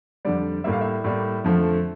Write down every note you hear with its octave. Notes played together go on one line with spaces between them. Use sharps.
F2 D3 G3 D5
A2 G3 A#3 E5
F5
E5
A2 G3 A#3
F2 D3 F3 A3